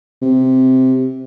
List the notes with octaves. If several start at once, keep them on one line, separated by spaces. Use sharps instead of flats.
C3